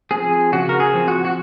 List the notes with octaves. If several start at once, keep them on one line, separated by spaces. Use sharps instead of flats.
F3 C4 G#4
C#3 F#4
A#4
G#4
F3 C4
F#4
F#4